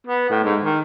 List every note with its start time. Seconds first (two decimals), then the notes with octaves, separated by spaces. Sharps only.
0.07 B3
0.30 A2
0.44 G#2
0.64 D#3